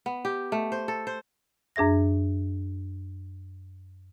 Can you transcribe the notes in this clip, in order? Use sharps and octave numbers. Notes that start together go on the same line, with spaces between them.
B3
G4
A3
C5
A4
C5
F#2 D4 G#4 E5 A#6